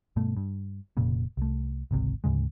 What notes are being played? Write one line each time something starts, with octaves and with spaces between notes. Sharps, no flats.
G2 B2 A3
G2
F1 A#2 C#3
C2 A3
G#1 C#2 C3
D2 G#2 C#3 G#3